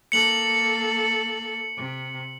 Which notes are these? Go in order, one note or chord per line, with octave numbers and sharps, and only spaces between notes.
A#3 A4 C#7 F#7
C3